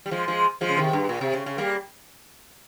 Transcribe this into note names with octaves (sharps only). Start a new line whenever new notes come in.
G3
F3 G#3
F3 G#3
F3 G#3
C#3
C3 D#3
G2
A#2
C3
C#3
C#3
G3 A#3